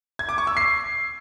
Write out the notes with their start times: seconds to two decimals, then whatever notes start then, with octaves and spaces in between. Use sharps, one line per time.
0.19 G#6
0.29 D6
0.38 C#6
0.47 E6
0.57 C7